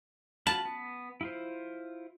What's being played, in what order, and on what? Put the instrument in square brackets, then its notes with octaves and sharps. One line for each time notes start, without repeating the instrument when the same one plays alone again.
[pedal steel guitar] F4 F#4 B5 [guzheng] A5
[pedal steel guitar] B3
E4 F4 C5